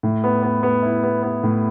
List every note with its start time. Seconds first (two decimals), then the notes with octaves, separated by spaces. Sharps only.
0.03 A2
0.24 B3
0.43 B3
0.63 B3
0.83 E4
1.04 B3
1.23 B3
1.43 A2